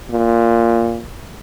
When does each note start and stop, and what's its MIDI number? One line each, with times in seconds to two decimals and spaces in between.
0.11 1.03 46